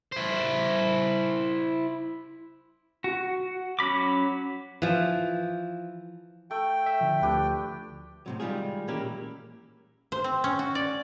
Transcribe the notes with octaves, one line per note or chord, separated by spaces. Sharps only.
E4 C5
F#4
F#3 C#4 B5 D6
E3 F3
A3 G5
E5
D3 F3
D2 D4 G4 B4
A2 C3 F#3
D#3 G3 G#3 F4 G#4
A#2 E3 A#3 C#4 E4 G4
C5
C4
C#4
F#4
D5